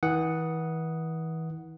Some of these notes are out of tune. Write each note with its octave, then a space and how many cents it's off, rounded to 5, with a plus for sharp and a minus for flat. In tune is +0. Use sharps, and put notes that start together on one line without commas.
E3 -35 F#5 +0 D#6 +0